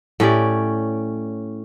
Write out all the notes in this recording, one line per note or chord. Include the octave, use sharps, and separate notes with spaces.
A2 C#4 G4 D5